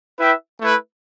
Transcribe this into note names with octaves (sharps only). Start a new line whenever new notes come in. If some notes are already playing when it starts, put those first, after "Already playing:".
E4 B4 E5 G5
A3 E4 B4